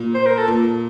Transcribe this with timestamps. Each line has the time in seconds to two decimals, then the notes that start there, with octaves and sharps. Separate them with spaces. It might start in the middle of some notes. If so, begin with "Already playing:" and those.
Already playing: A#2
0.14 C5
0.26 A#4
0.37 A4
0.48 A#2